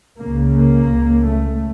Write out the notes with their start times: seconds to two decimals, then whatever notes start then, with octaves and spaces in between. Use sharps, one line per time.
0.19 C#2 C#3 A#3
0.56 A#3
0.93 C#2 C#3
1.29 A3